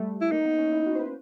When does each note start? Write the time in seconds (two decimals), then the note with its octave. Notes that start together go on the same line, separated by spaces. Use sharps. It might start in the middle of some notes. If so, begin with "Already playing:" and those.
Already playing: G3 A3
0.21 E4
0.32 A#3 D#4
0.45 B3
0.58 C#4
0.72 E4
0.86 F#4
0.95 C5
0.99 B4